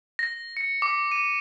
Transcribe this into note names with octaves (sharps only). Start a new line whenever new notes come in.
A#6
C#7
D6
D#7